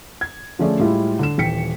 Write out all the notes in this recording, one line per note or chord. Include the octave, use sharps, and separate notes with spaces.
G#6
D3 F3 A3 C#4 G#4 D5
A2 G3 G#3 E4 F4
D3 E7
D#1 E3 G5 B6 C#7